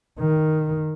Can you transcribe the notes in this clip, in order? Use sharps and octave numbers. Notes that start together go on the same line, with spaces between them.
D#3